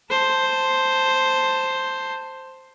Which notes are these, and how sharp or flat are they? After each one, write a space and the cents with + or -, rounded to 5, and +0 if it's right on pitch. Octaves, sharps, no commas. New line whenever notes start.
C5 +0 A5 +15